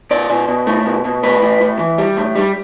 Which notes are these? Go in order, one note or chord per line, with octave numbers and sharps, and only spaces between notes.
B2 D5
B2
B2
A3
B2
B2
A2 B4
A2
A2
E3
G3
A2
G3